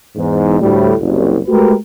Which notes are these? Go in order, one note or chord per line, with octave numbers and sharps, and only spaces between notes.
E2 G#2
D2 A2 G3
F#1 C2
G#3 A3 F#4 G4 A#4 B4